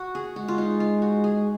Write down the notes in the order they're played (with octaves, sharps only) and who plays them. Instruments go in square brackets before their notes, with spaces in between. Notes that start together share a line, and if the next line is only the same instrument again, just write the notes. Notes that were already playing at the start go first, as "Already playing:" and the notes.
Already playing: [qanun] F#4
G#4
[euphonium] G#3 [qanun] F#4
[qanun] F4
D#4
F4
F#4
G#4